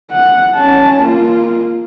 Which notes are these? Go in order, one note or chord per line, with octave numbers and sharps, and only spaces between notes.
F#5
C#4 A5
A#3 F4